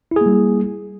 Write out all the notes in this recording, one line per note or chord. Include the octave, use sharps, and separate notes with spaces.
G3 A#3 E4 G#4